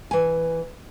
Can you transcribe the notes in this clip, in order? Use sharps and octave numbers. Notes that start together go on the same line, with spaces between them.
E3 G#5